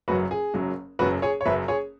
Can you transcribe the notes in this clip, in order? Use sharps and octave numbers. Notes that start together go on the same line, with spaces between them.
F#1 F#2 F#3 F#4 B4
G#4
F#1 F#2 F#3
F#1 F#2 F#3 F#4 B4
G#4 C#5
C#5
F#1 F#2 F#3 B4 E5
G#4 C#5